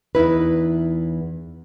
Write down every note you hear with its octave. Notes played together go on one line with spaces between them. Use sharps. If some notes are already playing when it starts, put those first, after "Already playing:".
E2 D#4 E4 B4